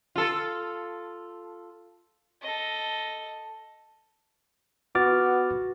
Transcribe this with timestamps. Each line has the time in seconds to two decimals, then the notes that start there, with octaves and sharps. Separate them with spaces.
0.16 F4 A4
2.42 A4 D#5
4.95 B3 F#4 D6 F6 A6